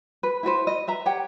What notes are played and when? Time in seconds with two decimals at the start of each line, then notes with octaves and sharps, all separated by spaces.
0.23 B4
0.43 E4 F#4 B4 C5
0.67 D#5
0.87 B4 E5 A#5
1.06 G4 C#5 F#5 G5